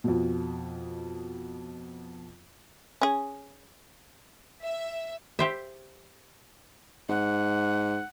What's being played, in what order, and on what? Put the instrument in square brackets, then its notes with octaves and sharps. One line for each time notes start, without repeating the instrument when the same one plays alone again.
[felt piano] F2 B2
[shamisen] C#4 G#4
[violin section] E5
[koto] G4 C5 E5
[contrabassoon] G#2 [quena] F#5